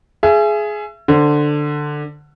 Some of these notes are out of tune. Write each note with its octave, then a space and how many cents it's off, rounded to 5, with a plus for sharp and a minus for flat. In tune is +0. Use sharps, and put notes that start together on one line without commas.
G#4 +15 E5 +35
D3 +10 C5 +5